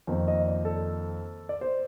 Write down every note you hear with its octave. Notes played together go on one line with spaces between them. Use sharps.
F2 D#3 A#3
D#5
D5
A4
D5
C5